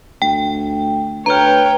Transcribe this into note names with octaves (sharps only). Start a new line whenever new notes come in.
D2 G5
D2 B4 C#5 G5 A#5 F6